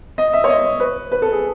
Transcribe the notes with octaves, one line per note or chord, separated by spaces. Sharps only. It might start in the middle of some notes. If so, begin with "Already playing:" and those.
D#5
E5
C#5
D#5
B4
B4
A4
G#4